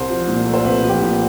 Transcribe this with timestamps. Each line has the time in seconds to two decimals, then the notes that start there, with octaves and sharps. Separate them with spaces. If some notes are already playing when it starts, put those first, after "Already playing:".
Already playing: C2 C5
0.09 F3
0.28 A#2
0.46 A3
0.53 C5
0.64 C2 B4
0.83 F3
0.89 G4
1.02 A#2